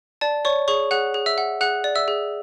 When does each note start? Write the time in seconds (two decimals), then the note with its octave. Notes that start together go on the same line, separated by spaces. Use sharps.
0.21 D5 A5
0.45 C#5 D5 C#6
0.68 G#4 C#5 C#6
0.91 G#4 F#5 F#6
1.14 G#4
1.26 E5 E6
1.38 F#5
1.61 G#4 F#5 F#6
1.84 D5
1.95 E5 E6
2.08 G#4